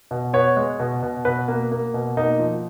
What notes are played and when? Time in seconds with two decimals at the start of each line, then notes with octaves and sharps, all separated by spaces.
0.11 B2
0.33 B3 C#5
0.57 G#3
0.79 B2
1.03 B2
1.25 B2 B4
1.48 A#3
1.72 A#3
1.94 B2
2.17 A#3 D#4
2.39 F3